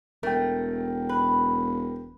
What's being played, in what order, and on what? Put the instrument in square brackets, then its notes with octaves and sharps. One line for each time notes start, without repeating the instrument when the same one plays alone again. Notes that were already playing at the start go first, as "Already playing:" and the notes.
[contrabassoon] E1 [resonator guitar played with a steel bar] A3 [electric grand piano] A#4 G5
[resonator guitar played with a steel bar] B4